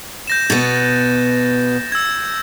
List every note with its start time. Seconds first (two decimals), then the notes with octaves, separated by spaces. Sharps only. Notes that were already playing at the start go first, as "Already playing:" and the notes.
0.27 G6 A#6 E7
0.50 B2 B3 A6
1.92 E6 G#6